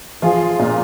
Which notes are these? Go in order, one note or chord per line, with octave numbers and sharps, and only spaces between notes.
F3 F4 G#4
A#2